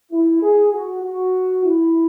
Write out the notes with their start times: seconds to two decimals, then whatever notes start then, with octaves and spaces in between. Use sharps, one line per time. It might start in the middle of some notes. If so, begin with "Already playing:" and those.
0.12 E4
0.42 G#4
0.73 F#4
1.03 F#4
1.65 E4